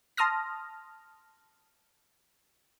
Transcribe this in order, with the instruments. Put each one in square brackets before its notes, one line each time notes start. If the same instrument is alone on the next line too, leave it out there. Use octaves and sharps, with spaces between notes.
[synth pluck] A5 C6 D#6 F6 A#6